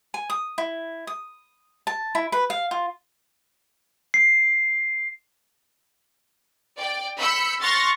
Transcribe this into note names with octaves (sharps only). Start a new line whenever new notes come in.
G#5
D#6
E4
D#6
A5
E4
B4
F5
F4
C7
D5 G5
B5 E6 G6 B6 C#7
C6 C#6 F6 F#6 A6 A#6